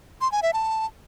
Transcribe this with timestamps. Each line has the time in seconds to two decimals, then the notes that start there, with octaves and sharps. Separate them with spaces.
0.21 C6
0.32 G#5
0.43 E5
0.53 A5